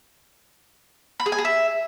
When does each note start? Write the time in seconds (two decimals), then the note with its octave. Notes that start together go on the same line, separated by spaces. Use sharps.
1.20 B5
1.26 G#4
1.32 G#5
1.38 G#4
1.45 E5